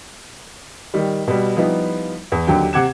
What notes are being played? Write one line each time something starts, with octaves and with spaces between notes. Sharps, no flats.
D#3 G3
B2 G3
F3 G3 B3 D#4 E4
E2
D#2 D3 F#3 G4 G5
C3 F#5 D6 G#6 E7